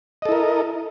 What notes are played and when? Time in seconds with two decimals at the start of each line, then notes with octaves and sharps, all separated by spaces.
0.22 D#5
0.25 A4
0.29 E4
0.32 A#4